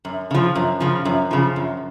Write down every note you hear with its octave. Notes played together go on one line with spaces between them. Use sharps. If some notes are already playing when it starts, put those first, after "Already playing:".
F#2
C#3 F3
F#2
C#3 F3
F#2
C#3 F3
F#2